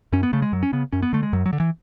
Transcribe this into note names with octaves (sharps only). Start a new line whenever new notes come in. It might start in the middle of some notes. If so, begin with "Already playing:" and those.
F#2 C#4
B3
C#3 A3
G#3
F#2 F#3
C#4
C#3 B3
F#2 C#4
B3
D3 A3
G#3
F#2 F#3
F#3
D3
E3